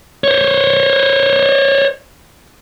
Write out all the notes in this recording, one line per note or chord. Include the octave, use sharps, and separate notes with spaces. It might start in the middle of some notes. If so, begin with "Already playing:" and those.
C5 C#5